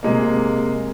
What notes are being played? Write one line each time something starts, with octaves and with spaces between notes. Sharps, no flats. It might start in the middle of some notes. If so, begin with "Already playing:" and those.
C3 G#3 A#3